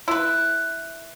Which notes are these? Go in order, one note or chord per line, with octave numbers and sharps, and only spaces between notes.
E4 B4